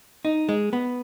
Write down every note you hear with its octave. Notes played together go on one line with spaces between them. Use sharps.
D#4
G#3
B3